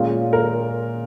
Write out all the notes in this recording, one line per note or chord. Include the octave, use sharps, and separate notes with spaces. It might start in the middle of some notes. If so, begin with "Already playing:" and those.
Already playing: A#2 G#3 C#4 F4
A#4